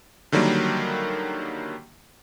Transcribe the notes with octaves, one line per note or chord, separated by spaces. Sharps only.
D3 D#3 F#3 G3 A#3